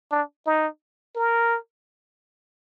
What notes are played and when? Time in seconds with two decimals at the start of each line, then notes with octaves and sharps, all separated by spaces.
0.11 D4
0.46 D#4
1.16 A#4